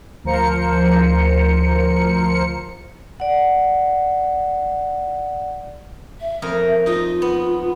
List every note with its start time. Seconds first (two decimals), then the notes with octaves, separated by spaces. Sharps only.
0.24 D2 F3 A#4 C5 C#7
3.20 D5 F#5
6.21 E5
6.42 F2 A#4 D#5
6.86 D#4 F4 D#5
7.22 B3